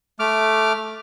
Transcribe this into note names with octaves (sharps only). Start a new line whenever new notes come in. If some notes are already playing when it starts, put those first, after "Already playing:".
A3 D6 F6